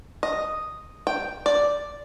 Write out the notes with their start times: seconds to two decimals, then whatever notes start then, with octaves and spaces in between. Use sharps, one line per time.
0.23 D#5
1.07 G5
1.46 D5